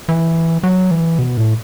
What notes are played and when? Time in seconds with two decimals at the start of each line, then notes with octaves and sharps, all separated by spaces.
0.09 E3
0.63 F#3
0.91 E3
1.19 B2
1.37 A2